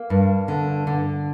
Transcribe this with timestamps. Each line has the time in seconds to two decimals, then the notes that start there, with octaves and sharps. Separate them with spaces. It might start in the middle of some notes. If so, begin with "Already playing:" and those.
Already playing: A#3
0.10 G2
0.48 D3
0.87 D3